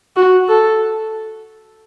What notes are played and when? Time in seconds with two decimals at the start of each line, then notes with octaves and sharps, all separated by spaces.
0.16 F#4
0.48 A4